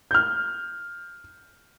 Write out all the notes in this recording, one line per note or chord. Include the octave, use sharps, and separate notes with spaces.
F6 G6